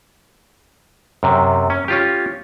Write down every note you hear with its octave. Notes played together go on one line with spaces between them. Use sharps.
F#2 C3
C#4
C#4 F4 G4